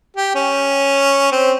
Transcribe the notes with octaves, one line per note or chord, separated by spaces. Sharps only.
G4
C#4
C4